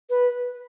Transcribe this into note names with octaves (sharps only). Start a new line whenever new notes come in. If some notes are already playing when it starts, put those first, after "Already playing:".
B4